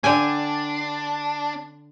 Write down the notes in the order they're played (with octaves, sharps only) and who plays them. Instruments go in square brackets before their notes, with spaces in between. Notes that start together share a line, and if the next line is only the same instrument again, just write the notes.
[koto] D3 G5 G#5 [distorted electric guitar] D4